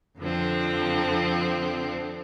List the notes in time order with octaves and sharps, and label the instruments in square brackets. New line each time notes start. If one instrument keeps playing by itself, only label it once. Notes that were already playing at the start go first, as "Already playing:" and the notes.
[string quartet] F2 D3 F3 C4